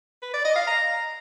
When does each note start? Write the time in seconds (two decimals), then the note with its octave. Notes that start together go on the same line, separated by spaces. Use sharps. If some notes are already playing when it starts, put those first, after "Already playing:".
0.22 B4
0.33 D5
0.45 D#5
0.56 F5
0.67 A#5